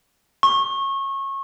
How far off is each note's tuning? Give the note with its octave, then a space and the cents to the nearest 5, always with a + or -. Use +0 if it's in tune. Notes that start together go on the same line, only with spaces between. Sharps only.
C#6 -25